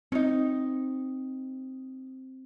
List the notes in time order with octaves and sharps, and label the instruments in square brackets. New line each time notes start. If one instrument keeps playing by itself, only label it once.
[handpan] C4 [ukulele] C#4 D#4